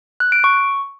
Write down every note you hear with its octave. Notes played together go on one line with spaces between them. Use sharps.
F#6
D7
C#6